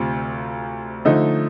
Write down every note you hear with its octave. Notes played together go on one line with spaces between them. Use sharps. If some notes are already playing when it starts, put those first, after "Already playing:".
Already playing: D2 C3 F4
D3 F3 A3 D#4